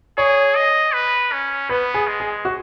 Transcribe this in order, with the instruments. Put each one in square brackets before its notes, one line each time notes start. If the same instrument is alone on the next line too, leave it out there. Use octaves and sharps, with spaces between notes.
[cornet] G#4 [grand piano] C#5
[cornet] D#5
B4
C#4
[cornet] B3 [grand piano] B4
[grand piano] G#4
[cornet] G#3
[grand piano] G#4
F#4